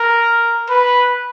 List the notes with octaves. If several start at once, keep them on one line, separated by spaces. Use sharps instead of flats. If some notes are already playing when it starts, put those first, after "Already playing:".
Already playing: A#4
B4